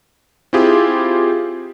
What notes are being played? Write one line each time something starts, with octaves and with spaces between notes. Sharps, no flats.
C4 E4 F4 G4 G#4